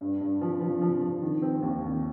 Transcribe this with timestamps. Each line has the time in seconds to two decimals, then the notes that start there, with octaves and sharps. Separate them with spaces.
0.01 G2
0.21 G2
0.41 F3
0.61 F3
0.82 F3
1.02 F3
1.22 D#3
1.42 C4
1.62 D#2
1.83 D#2